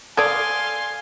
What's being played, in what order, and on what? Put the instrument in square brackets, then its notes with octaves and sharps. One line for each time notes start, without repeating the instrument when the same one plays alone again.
[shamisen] A4 D5 [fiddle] F5 C6 [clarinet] G#5 [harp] D#6 G#6 D7